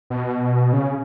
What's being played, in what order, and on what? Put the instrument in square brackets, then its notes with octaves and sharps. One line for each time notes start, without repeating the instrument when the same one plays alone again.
[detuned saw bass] B2
C#3